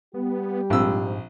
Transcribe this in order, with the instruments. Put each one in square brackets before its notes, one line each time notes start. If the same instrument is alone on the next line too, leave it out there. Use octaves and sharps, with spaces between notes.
[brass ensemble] G3 G4 [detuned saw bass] B3
[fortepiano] A#1 C4 E6 [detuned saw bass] G#2